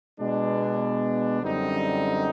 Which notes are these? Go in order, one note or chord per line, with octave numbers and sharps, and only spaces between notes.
B2 G#3 B3 D4
F#2 D3 G3 C4 D#4